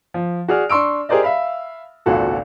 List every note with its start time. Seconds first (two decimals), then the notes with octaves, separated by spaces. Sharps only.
0.14 F3
0.48 F#4 G#4 D5 F6
0.70 D4 C6 C#6 E6 D7
1.09 G4 G#4 A#4 C5 D5 D#5
1.23 E5 F5 B5
2.06 G#1 C#2 A#2 F#4 A4